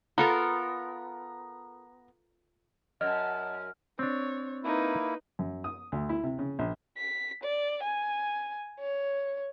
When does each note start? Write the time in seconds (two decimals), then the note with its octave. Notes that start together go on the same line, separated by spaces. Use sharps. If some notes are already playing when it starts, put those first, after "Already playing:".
0.18 B3 F4 A4 A#4 A#5
3.01 F#2 D#5 F#5 A5 F6
3.99 C4 D4 C#5
4.64 A#3 D#4 E4 B4
5.39 F#2
5.64 D#6
5.92 D2
6.09 E4
6.24 C3
6.39 C#3
6.59 A#1
6.97 B6
7.44 D5
7.83 G#5
8.80 C#5